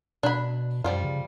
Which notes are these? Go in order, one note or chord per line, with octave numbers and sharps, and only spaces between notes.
B2 D4 B5
F#2 F3 G3 F4
C#3